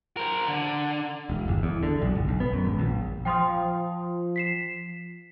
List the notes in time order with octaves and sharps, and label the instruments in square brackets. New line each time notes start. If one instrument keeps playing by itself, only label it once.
[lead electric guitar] A#4 C5
D3
[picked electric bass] E1
G1
E2
D3
B1
G1
B1
B3
F#2
G#1
A#1
[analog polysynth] F3 [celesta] G5 C6 D#6
[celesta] B6 C7 E7